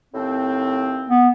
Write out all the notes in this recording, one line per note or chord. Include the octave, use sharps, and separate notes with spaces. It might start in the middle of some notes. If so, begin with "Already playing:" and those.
D#2 A2 C4
B3